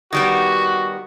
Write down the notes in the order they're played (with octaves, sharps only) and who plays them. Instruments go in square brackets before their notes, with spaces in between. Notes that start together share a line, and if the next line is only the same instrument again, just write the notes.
[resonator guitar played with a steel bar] D#3 G3 B3 [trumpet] F#4